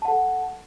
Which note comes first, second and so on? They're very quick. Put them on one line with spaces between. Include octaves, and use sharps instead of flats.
A5 F#5 A4